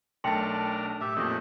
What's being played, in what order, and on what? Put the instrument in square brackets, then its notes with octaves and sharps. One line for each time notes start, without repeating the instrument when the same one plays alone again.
[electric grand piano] B1 A3 A5 [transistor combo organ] D4 A#4 F6 [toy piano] G5 C6
[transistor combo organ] A2 [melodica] G4 E5
[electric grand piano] F2 A#2 [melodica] A3 D#5 [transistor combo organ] C#4 F#4 G4